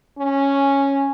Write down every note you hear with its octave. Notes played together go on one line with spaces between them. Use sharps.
C#4